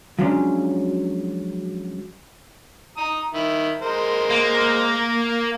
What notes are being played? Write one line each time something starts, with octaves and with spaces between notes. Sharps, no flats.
F3 F#3 G#3 C#4 D4
A#5 D#6
D#3 E4
G#3 A#4 C5
A#3